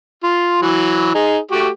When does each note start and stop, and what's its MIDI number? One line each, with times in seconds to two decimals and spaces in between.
0.23 0.60 65
0.62 1.12 52
0.62 1.12 54
1.15 1.38 63
1.15 1.38 68
1.51 1.69 57
1.51 1.69 66
1.51 1.69 67